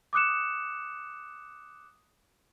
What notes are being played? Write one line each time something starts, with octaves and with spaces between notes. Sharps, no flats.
D6 D#6 F#6 C#7 E7